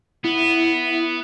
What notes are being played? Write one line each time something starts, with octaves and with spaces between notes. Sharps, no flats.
B3 E4